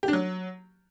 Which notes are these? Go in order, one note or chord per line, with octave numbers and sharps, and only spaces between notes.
G4
D4
F#3